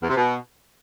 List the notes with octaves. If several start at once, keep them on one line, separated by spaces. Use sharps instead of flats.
E2
C3
B2